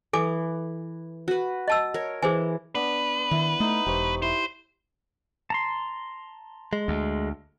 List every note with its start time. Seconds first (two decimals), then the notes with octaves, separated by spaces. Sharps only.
0.13 E3 A4 G#5 D6
1.28 F#4 B4
1.68 D#5 A5 E6
1.94 A#4 C#5
2.22 E3 G#4 C5 G#5
2.75 B3 D4 B4
3.31 D#3 E4
3.60 A3 D#4
3.86 E1 G4 C5 C#6
4.22 E4 C5
5.50 A5 A#5 C6
6.73 G#3
6.88 D2